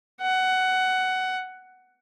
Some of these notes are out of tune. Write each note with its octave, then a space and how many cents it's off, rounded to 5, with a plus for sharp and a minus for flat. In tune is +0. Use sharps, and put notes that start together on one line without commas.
F#5 +15